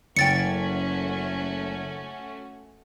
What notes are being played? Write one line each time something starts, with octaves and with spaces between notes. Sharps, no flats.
F#1 A3 C#4 F#4 G5 A6 C#7